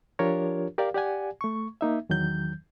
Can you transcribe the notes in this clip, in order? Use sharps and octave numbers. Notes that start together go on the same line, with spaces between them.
F3 D4 F4 G4 A#4 C#5
G4 A#4 D5 F5
G4 D5 F#5 G#5
A3 C#6
A#3 D#4 E5
E2 D#3 F#3 G6